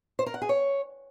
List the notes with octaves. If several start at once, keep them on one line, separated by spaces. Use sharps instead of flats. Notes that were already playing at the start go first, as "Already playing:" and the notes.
C5
A#4
F#5
G#4
C#5